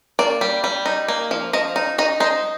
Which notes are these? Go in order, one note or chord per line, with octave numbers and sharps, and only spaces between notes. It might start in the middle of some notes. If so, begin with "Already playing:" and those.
A#3 D5
G3
G3
D#4
A#3
F3
F3 D#5
D#4
D#4 D#5
D#4 C5